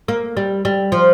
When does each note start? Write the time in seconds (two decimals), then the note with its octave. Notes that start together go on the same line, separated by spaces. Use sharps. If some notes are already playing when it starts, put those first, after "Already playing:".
0.08 A#3
0.37 G3
0.65 G3
0.92 F3